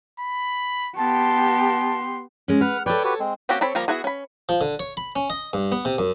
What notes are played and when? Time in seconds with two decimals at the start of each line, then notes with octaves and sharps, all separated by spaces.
0.20 B5
0.97 B3 G4 A5 C6
2.48 G#3 C#4
2.61 B4 F#5 F6
2.86 A4 B4 C#5 D5 G5
3.04 F#4 G4 B4
3.20 G#3 C4
3.49 A#3 C4 C#4 F#4 G4
3.61 C4 A4 C#5 B5
3.75 F3 G3 A#3 A#5
3.88 B3 E4 F#4 G#4
4.04 C#4 B5
4.49 F3
4.61 D3
4.80 C#5
4.97 B5
5.16 C#4
5.30 D#5
5.53 G2
5.72 B3
5.85 C3
5.98 F#2